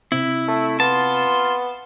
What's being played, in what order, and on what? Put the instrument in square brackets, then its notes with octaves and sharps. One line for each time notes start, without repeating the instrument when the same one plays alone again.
[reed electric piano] C3 C4 [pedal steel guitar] E4
[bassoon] A3
[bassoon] B3 [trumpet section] F4 C6 [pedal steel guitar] A5